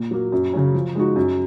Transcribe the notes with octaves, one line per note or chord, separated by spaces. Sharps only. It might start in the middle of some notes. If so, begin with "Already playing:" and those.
Already playing: A#2
F#3 A#3
F#2
C#3 F#3 C#4
F3
G#3 D#4 F#4
F#2